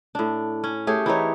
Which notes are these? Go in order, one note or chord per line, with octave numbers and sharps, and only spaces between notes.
A2 D4
C#4
A3 G4 G#4 C#5
E3 C4 D#4 C#5